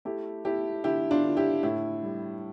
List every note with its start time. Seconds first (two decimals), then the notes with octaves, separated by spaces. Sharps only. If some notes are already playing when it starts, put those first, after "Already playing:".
0.05 A3 E4 G4
0.45 A3 E4 G4
0.84 D3 E4 G4
1.11 D4 F4
1.24 D3
1.37 E4 G4
1.63 A2 E4
2.03 G3